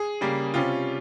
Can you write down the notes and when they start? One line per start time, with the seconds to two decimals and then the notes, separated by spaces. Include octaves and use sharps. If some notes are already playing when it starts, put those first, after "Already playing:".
Already playing: G#4
0.21 C#3 G3 A#3
0.54 C3 G3 C#4 F4